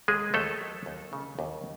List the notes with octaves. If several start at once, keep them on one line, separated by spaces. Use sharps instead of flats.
D#2 G#3 G#4
D#2 A3 A4
F#3
D#2
C#3
D#2